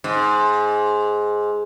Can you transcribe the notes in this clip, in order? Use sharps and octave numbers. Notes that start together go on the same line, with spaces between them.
G#2